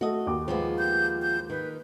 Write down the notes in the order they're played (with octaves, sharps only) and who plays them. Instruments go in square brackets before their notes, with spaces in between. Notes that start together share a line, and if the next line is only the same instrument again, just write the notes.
[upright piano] A3 A4 [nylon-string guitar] F#4 D#5
[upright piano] D#2 D6
[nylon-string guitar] F3 G#3 B3
[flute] G6
G6
[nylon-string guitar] D#3 [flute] B4